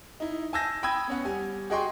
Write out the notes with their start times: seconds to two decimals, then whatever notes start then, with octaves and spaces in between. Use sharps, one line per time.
0.20 D#4 E4
0.53 G#5 A5 E6 G6 A#6
0.83 G5 B5 D#6 E6 G#6
1.08 B3 C#4 F#5
1.25 G3 G#5
1.70 F#4 G#4 D#5 G5 C6 C#6